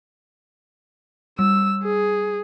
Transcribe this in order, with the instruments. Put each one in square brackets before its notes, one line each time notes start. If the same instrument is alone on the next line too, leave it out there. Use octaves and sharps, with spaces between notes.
[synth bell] G3 [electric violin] E6
[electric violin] G#4